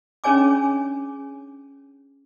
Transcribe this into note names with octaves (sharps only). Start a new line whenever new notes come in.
C#4 D4 G#4 C#5 G#5 D6